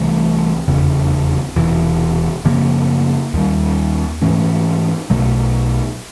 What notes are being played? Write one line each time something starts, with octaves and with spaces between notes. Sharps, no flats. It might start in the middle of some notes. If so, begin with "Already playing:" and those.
Already playing: C2 C3 E3 A3
F1 E2 C#3
E1 E2 C3 E3
F#2 C#3 F3 A#3
D#2 D#3 G3
G#2 E3 A3 C#4
B1 B2 F#3 A3